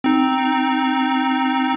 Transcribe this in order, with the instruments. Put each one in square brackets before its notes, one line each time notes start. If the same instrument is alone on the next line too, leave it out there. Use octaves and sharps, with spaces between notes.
[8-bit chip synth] C4 D#4